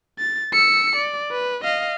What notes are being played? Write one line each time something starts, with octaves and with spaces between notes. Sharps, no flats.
A6
E6 C#7
D5
B4
D#5 F5